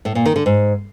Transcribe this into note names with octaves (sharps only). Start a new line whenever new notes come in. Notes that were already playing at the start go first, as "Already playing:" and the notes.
A2
A#2
D#3
D3
G#2